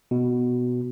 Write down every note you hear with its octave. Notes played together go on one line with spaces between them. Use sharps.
B2